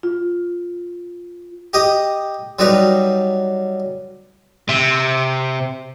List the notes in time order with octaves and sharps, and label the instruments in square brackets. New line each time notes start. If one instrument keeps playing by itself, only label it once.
[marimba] F4
[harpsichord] G4 D#5 D#6
F#3 G3 D#4 B4
[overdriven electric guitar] C3